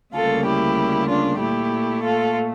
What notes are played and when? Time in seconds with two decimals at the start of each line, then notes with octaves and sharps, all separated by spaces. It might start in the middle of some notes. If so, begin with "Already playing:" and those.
0.14 D2 C#3 G3 A#3 F4 A4
0.46 E4 G4
1.09 D4 F4
1.40 A#2 A3 E4 G4
2.03 F4 A4